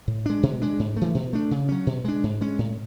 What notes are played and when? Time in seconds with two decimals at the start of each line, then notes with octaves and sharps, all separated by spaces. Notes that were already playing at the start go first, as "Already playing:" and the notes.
0.08 A2
0.26 G#3 D4
0.43 B2
0.62 G#3 D4
0.79 G#2
0.96 E3 A3
1.15 B2
1.33 A3 D4
1.51 C#3
1.69 F#3 C#4
1.87 B2
2.05 G#3 D4
2.23 G#2
2.41 G#3 C#4
2.59 A2